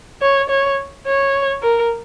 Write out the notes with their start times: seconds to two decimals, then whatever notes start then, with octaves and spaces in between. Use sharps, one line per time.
0.22 C#5
0.50 C#5
1.06 C#5
1.62 A#4